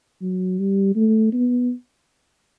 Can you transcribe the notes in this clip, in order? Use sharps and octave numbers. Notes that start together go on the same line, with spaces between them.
F#3
G3
A3
B3